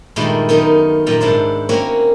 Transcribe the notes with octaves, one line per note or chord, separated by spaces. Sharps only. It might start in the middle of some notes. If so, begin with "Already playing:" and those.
G2 A#2 D#3 G#3 A3 E4
F#2 D#3 B3 D#4
F#2 A#2 G5 A#5
G#2 D4 E4 C5
A#3 C4 C#4 F#4 C#5